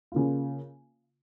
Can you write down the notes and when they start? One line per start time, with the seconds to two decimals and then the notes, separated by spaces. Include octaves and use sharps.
0.12 C#3 A#3 F4